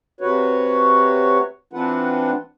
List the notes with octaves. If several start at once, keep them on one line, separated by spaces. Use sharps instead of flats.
C3 F#4 B4 C#5
E3 C4 D4 F4 B4 F#5